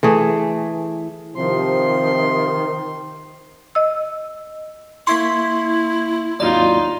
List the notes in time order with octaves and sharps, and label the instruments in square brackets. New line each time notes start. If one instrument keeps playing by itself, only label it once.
[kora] E3 A3 G#4
[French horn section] C3 F3 [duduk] D#3 [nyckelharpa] C6
[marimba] D#5 E6
[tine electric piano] A#3 E5 C#6 [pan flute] E4 [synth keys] C6 G#6 B6
[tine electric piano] G#1 D#2 F#3 [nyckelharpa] D#4 F4 [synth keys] D5